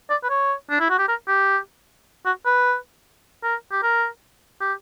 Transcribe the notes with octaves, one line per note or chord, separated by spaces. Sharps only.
D5
B4
C#5
D4
E4
F#4
G4
A#4
G4
F#4
B4
A#4
G4
A#4
G4